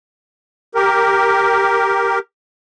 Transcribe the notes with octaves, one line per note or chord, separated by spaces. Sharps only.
G4 A#4